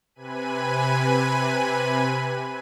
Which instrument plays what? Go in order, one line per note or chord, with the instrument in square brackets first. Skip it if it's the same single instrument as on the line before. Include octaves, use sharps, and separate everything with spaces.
[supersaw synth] C3 B4 G#5 B5 D#7